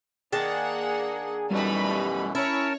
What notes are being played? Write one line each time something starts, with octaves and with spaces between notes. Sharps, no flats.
D#3 A#3 D4 G#4 F#5 A5
F#2 B2 E3 G3 A3 D#4 B5
C#4 E4 A#4 C#5 A5